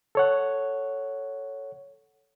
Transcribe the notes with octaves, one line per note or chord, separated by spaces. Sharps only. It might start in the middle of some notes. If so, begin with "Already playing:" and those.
A4 C#5 F#5